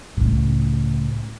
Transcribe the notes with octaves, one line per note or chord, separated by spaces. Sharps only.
C#2 A2